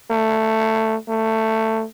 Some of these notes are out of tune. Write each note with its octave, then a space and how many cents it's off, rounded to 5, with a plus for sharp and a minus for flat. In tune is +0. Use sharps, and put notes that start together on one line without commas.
A3 +10
A3 +15